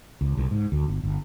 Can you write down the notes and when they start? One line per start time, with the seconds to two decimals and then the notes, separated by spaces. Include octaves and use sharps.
0.21 C#2
0.37 C2
0.51 G#2
0.72 D2
0.88 G1
1.03 G1